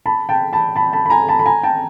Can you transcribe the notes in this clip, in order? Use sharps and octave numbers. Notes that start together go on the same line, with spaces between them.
A5 B5
G5 A5
A5 B5
A5 B5
A5 B5
B5
G#5 A#5
A5 B5
B5
G#5 A#5
G5 A5